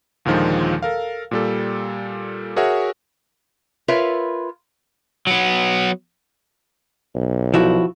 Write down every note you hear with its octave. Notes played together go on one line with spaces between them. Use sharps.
D#2 A#2 D3 D#3 F3 G#3
A4 A#4 F5
A#2 G3 A4
F#4 G#4 A#4 C#5 E5 F#5
F4 A#4 B4 C#5 E5
F#3 B3
B1
F3 E4 F#4